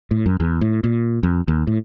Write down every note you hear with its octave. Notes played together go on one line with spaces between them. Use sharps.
A2
F#2
E2
A2
A#2
F2
D#2
A2